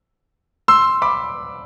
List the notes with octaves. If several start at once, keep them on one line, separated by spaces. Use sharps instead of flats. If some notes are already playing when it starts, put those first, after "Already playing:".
C6 E6
B5 D6